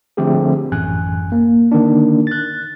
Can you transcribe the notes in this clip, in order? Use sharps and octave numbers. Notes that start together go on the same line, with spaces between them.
D3 F3 A3 C4 G4 G#4
A1 F#2 G#5 F#6
A#3
D3 D#3 A#3 D4
F#6 A6